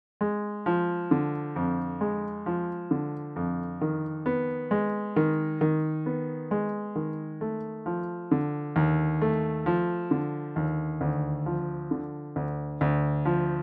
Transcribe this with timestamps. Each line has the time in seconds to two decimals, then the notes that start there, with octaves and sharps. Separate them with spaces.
0.21 G#3
0.66 F3
1.11 D3
1.56 F2
2.01 G#3
2.46 F3
2.91 D3
3.36 F2
3.81 D#3
4.26 B3
4.71 G#3
5.16 D#3
5.61 D#3
6.06 B3
6.51 G#3
6.96 D#3
7.41 A3
7.86 F3
8.31 D3
8.76 D#2
9.22 A3
9.66 F3
10.11 D3
10.56 D#2
11.01 D2
11.46 F3
11.91 D3
12.36 D2
12.81 D2
13.25 F3